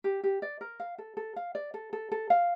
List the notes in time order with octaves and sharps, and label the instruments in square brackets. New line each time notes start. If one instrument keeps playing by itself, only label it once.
[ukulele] G4
G4
D5
A#4
F5
A4
A4
F5
D5
A4
A4
A4
F5